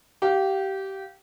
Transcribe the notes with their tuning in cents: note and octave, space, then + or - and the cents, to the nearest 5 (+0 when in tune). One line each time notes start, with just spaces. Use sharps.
G4 -20 F5 +0